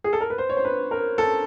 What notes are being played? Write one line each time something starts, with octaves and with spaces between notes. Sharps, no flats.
G#4
A4
A#4
B4
C5
C#5
C5
B4
A#4
A4